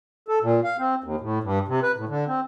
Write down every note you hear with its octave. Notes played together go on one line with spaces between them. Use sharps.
A4
A#2
F5
C4
D#2
A2
G2
C3
B4
A2
D3
C4